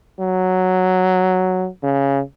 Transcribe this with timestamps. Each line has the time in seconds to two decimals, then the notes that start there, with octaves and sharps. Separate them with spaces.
0.20 F#3
1.83 C#3